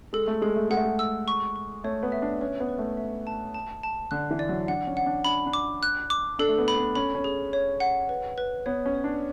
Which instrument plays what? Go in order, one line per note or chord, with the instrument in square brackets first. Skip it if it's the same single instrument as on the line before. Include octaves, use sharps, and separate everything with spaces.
[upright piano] G#3 [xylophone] A4
[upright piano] A3
[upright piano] G#3 [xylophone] A4
[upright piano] A3
[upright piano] G#3 [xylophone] F#5
[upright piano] A3
G#3
[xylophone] E6
C#6
C#6
[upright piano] A3 [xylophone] C#5
[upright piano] B3
[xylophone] E5
[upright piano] D4
[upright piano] C#4 [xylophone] B4
[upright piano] B3
[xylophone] B4
[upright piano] A3
[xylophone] E5
A5
A5
A5
[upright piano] D3 [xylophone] F#6
[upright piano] E3
[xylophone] D5
[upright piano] F#3
[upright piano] D4 [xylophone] F#5
[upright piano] C#4
[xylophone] F#5
[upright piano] D4
[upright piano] D4 [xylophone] B5
[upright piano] D4
[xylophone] D6
F#6
D6
[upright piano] D4 [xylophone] A4
[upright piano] A3
B3
[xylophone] B5
[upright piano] B3
[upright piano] C#4 [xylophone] B5
[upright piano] C#4
[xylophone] G#4
C#5
F#5
B4
B4
[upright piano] B3 [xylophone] C#5
[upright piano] C#4
[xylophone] C#5
[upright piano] D4